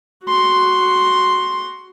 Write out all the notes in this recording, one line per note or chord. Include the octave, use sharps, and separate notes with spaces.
F#4 C6